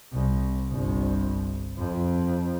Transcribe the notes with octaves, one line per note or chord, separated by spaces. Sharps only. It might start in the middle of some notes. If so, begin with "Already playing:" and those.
C2
G1 C2
F2